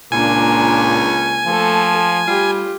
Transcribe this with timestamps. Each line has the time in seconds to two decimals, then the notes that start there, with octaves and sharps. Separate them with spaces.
0.12 C#2 A#2 A#3 D4 G#5
1.46 F3 A3 A4
2.28 G3 F4 G4